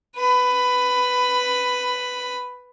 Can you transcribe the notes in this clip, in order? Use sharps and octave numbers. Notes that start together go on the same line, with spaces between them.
B4 B5